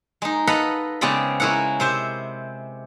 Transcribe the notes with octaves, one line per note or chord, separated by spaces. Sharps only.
G#3 D#4
A4 B4 D#5 F5 F#5 B5
C#3 G#3 B3 C4 D5 B5
G#3 C#4 E4 A#4 F#5
C3 C5 E5